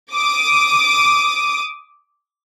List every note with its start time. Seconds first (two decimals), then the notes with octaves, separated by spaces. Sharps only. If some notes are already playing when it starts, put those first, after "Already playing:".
0.13 D6 D#6